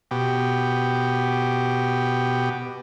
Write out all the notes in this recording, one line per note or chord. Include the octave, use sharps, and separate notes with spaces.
B2 G4